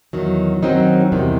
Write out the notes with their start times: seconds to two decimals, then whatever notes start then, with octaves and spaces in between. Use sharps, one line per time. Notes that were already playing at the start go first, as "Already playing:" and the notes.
0.13 E2 D#3 F#3
0.62 F#2 D#3 F#3 C4 D#4
1.12 E2 C3 D#3 G3